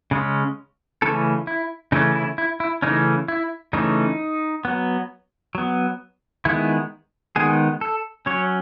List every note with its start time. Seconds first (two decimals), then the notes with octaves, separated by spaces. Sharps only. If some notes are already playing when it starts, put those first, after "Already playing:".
0.11 C#3 G#3 C#4
1.02 C#3 E3 A3 C#4 A4
1.47 E4
1.92 C#3 E3 A3 C#4 D#4
2.15 E4
2.38 E4
2.60 E4
2.82 C#3 E3 A3 C#4 D#4
3.28 E4
3.73 C#3 E3 A3 C#4 D#4
4.65 F#3 B3
5.55 F#3 B3
6.45 D#3 G#3 B3 E4
7.36 D#3 G#3 B3 G#4
7.81 A4
8.26 F#3 C#4 C#5